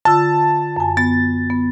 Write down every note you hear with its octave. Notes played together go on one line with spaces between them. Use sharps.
D3 F4 A5 E6
F#2 G#5
B3 A6
B3